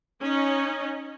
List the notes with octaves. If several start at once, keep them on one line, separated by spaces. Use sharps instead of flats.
C#4 D#4 D#5